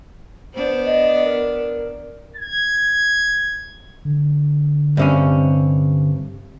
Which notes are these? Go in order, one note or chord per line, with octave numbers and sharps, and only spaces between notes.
B3 D4 C5
D#5
A#4
G#6
D3
G2 C3 C#4